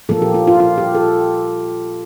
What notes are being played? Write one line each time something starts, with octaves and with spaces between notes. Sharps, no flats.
A#2 F3 A#3 A4
G4
F4
F4
F4
G4
A4